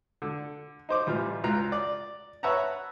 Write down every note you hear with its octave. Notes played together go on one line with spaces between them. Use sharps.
D3
D#4 C5 D6
A1 G3 F4 F6
C#2 F4 A#5 F#6
D5
B4 C#5 E5 F#5 A5 A#5